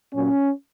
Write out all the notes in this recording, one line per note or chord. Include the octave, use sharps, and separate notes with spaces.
A#2 F#3 C#4